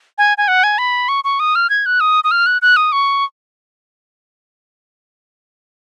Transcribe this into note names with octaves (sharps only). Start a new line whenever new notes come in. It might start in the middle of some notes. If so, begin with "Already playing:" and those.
G#5
G#5
F#5
G#5
B5
C#6
C#6
D#6
F6
G#6
F#6
D#6
D#6
F6
F#6
F#6
D#6
C#6